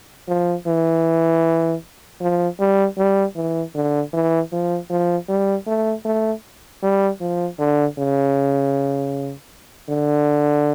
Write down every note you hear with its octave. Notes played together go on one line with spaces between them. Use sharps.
F3
E3
F3
G3
G3
E3
D3
E3
F3
F3
G3
A3
A3
G3
F3
D3
C#3
D3